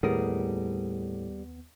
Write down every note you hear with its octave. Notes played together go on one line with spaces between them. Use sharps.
D#2 A2 G3 B3 G#4 A#4